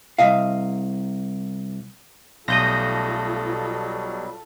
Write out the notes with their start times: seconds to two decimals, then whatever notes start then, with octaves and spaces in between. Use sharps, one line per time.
0.19 C2 D#5 F5
2.48 B1 G3 A3 F4 A4 D#6 G6 A#6
3.46 B2 F#3 G3